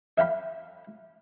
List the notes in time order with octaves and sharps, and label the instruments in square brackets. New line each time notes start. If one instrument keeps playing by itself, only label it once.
[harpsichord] E5 F5 G5 B5